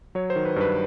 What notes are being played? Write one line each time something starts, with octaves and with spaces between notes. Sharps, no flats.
F#3 C#5
C5
D#3
B4
G2 B4